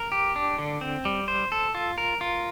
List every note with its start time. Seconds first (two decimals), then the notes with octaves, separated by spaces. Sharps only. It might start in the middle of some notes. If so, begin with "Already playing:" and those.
Already playing: A#4
0.12 G4
0.36 D4
0.58 D3
0.81 C4
1.05 G3
1.28 C5
1.52 A4
1.75 F4
1.98 A#4
2.21 F4